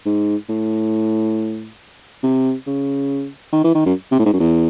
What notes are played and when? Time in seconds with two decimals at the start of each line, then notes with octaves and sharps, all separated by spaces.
0.06 G#2
0.49 A2
2.23 C3
2.67 C#3
3.53 D#3
3.64 E3
3.75 D#3
3.86 F#2
4.11 C3
4.19 A2
4.25 G#2
4.33 F#2
4.40 E2